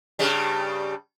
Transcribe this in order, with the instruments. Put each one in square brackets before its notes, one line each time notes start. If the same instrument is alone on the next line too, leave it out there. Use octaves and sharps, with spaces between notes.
[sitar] G2 C#3 G3